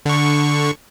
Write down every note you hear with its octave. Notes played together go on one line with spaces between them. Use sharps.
D3 C#6